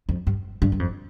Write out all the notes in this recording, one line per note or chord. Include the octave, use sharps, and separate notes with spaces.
F2
G2
G2
G2
F2